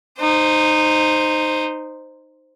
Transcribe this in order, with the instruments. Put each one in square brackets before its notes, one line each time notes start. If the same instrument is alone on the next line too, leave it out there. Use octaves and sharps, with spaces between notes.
[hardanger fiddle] D#4 C5